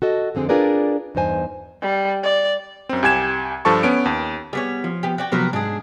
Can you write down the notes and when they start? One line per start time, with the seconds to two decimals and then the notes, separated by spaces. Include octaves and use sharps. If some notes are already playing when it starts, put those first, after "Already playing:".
0.02 F#4 A4 D#5
0.35 F2 D3 C4 G#4
0.49 D4 F4 G#4 A#4 B4 D5
1.15 E2 G2 D#4 C5 G#5
1.82 G3
2.23 D5
2.89 F#2 C4
3.03 C2 G4 G#5 G#6 E7
3.65 G2 F3 A4 A5 C#6
3.83 B3 C#4 D7
4.05 D#2
4.53 G3 B3 G#4 C#5
4.84 F3
5.03 B3 G4
5.18 F#4 D5 G5
5.32 C3 F3 F#3 B3 A#4 B4
5.53 G#2 D4 G#4